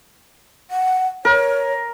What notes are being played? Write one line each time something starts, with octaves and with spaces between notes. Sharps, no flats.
F#5
A#4 C#5